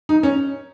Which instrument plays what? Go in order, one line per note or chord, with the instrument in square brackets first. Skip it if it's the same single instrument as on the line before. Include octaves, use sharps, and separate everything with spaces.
[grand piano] D#4
C#4